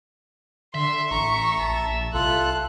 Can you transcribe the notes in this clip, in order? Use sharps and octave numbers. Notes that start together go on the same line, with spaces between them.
D3 E5 C6
A1 A#5 C#6
A#1 A5
C2 F4 A4 F#6